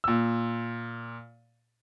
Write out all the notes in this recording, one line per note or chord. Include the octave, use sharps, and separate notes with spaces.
A#2 E6